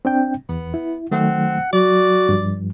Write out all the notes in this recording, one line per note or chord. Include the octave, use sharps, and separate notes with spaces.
C4 D4 G5
E2 B3
E4
D#3 F#3 A3 C4 F#5
F#3 F#4 D5
G2 F3